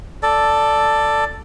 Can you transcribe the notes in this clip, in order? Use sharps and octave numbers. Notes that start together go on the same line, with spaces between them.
A4 D5